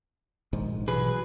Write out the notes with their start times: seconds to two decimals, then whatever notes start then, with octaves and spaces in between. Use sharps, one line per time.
0.53 A#1 G#2 D#3
0.88 B2 E3 F#3 G#4 B4